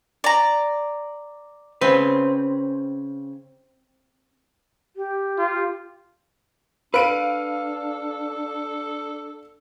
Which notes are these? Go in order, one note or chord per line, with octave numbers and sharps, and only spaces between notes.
D5 A#5
C#3 C4 B4
G4
F4
D4 A4 B4 F5 D7 D#7